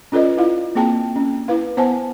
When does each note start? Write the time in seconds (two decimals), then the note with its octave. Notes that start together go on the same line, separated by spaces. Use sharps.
0.12 C#4 F4 A4 B4 D5 D#5
0.37 E4 F4 F5
0.75 A#3 C4 G#4 G5 A5
1.16 C#4
1.48 E4 B4 F5
1.77 B3 C5 F#5 G#5 A5